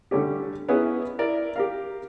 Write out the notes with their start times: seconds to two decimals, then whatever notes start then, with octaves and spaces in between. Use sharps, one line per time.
0.11 D3 G3 A3 C#4 G4
0.69 B3 C#4 D#4 E4 G#4 B4
1.19 E4 A#4 D5
1.56 G4 A#4 F5